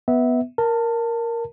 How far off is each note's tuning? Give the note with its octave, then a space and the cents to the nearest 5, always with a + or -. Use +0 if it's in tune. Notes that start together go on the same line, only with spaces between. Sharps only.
B3 +0 E5 -20
A#4 +0 A5 +25